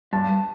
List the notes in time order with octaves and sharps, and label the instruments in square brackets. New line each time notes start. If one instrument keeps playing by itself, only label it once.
[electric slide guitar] G2 [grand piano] A5